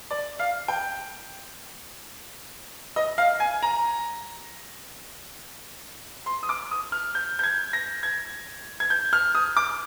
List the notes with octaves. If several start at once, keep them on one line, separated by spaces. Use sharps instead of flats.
D5
F5
G5
D#5
F5
G#5
A#5
C6
D#6
D6
D#6
F6
G6
G6
G#6
A#6
G#6
G#6
G6
F6
D#6
D6